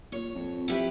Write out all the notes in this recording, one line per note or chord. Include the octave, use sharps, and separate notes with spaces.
A#2 C#5
F2
E4 G4 B4